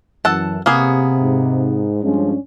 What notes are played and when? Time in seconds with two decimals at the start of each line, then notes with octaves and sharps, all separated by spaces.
0.25 F#2 E3 A4 F#5 A5
0.66 C3 A#3 B3 G#4
1.19 G#2
2.03 G2 F3 G#3 C#4 D4